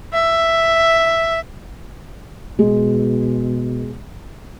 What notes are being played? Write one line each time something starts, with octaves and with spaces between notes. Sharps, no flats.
E5
B2 G#3